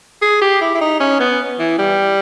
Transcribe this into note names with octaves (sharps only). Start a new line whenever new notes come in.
G#4
G4
E4
E4
D#4
C#4
B3
E3
G3